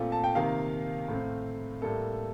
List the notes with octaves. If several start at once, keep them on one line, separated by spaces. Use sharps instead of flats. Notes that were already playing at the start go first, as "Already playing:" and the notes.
Already playing: A#2 A3 C4 F4
A5
G5
C3 D#3 A#3 F5
A2 A3 C4
A2 G3 A#3 A4